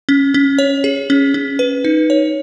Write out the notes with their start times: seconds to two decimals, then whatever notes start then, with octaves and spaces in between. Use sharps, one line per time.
0.09 C#4
0.34 C#4
0.59 C#5
0.84 G#4
1.10 C#4
1.34 C#4
1.59 B4
1.84 D#4
2.10 C#5